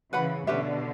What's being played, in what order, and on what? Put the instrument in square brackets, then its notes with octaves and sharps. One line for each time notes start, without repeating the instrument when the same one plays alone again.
[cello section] C#3 E3 [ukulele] B4 F#5 B5
[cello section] B2 D3 [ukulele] C#4 G4 B4 E5